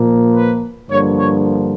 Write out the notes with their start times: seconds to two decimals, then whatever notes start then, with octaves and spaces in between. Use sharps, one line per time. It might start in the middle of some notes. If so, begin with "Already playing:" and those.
Already playing: A#2 F3 A#3
0.32 B4
0.89 G2 D3 F3 A#3 C#5
1.18 C#5